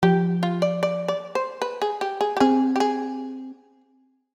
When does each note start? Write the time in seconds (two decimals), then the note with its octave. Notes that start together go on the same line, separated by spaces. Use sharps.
0.03 F3 G4
0.43 F4
0.62 D5
0.83 D5
1.08 D5
1.35 C5
1.62 B4
1.82 G#4
2.01 G4
2.21 G#4
2.37 G4
2.40 C4 G#4
2.76 G4
2.80 G#4